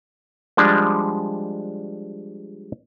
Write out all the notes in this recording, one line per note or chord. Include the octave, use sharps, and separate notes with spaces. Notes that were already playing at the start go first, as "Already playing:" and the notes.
F3 G3 G#3 D4